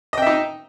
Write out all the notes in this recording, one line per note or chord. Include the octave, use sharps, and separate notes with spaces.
D#4 D#5 E5 G5